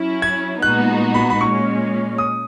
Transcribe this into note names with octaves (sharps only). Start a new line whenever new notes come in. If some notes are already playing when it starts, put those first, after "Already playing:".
Already playing: F#3 C#4 E4
G#6
A#2 G#3 B3 D#4 F#4 F#6
B5
B5
A#2 G#3 C#4 C#6
D#6